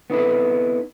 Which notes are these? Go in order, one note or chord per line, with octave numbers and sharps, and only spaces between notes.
B3 C4 D#4 E4 A4 B4